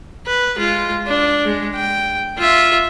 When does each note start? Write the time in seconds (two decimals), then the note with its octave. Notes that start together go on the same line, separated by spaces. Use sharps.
0.26 B4
0.56 G#3 F4
1.07 D4
1.45 G#3
1.75 G5
2.38 F4 E5